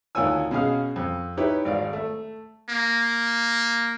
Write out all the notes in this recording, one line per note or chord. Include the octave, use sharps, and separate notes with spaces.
D2 D#3 F4 C#5 G#5 E6
B2 C#4 G#4 F5 F6
F2
D#4 E4 G4 B4 C#5
G#1 D5 F5
A3
A#3